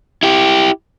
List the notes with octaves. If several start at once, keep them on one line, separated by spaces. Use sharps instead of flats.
E4 G4